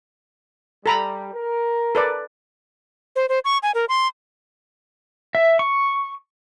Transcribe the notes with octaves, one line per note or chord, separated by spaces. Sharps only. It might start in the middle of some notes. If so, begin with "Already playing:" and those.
G3 A4 A#5 B5
A#4
A4 B4 D5
C5
C5
C#6
G#5
A#4
C6
E5
C#6